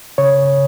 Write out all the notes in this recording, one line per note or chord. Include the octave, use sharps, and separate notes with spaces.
C#3 C#5